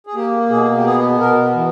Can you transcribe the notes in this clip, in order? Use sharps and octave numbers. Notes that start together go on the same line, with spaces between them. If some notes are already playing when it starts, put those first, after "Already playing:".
G#4
A#3 G4
B2 G#4
G4
B3 G#4
B2 A#4
E3